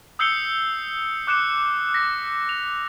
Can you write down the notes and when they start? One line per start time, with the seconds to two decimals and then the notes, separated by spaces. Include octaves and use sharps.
0.19 D#6 E6 G6 C7 C#7 G7
1.27 D6 F#6 C#7 E7
1.94 A#6 B6
2.49 F7